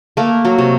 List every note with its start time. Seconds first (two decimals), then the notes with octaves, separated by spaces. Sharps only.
0.17 A3 A#3 A#4
0.45 F#3 F#4
0.58 C3